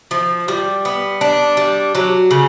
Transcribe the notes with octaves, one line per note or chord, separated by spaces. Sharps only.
F3
G3
B3
D4
G3
F#3
C#3